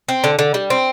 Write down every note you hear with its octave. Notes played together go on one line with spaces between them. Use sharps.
C4
D3
D3
G3
C4